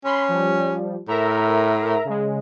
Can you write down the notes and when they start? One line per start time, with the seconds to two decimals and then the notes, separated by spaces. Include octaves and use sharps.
0.05 C#4 B5 C6
0.29 F3 G3
1.08 A2 A#4 E5 A#5
2.05 C#3 G#3